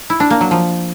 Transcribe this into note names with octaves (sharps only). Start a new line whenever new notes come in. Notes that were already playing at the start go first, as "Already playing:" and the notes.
E4
D4
A#3
F#3
F3